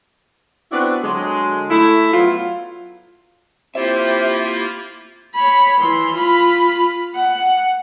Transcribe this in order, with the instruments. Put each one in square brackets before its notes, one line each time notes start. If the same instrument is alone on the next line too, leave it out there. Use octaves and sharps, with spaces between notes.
[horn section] B3 C4 D4 E4 F#4
D3 F#3 G#3
A3 E4
F#3 B3 F4
[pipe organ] A#3 E4 F4 [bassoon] C4 [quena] G4 [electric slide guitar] E5
[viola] C#5 B5
E3 C6
F4 B5
F#5